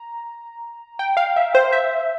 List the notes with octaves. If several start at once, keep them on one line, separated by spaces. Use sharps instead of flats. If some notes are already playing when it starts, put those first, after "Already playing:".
Already playing: A#5
G5
F5
E5
C5
E5